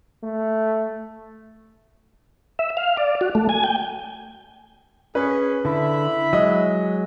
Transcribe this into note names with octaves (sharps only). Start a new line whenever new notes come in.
A3
E5
F5
D5
F#4
A3
G#5
G5
C#4 G#4 B4
D3 E4 E5 B5
F#3 G#3 D#5